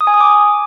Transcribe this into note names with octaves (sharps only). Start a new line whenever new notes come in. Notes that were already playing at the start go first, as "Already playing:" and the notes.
D#6
G#5
D#6
D6